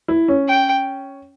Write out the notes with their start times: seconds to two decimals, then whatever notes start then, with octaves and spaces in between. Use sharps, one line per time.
0.08 E4
0.28 C#4
0.48 G5